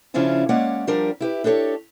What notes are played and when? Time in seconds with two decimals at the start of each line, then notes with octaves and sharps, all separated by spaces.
0.14 C#3 F3 C#4 D4 E4 F4
0.49 G#3 A#3 C#4 C#5 D5 F#5
0.87 F3 G3 D4 A#4
1.21 E4 G4 B4
1.44 D4 G4 A4 C5 C#5